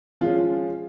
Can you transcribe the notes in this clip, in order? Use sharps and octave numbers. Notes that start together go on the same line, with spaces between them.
F3 G#3 C#4 F4